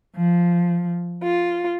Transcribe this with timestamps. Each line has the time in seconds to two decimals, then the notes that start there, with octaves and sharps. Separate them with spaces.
0.17 F3
1.23 F4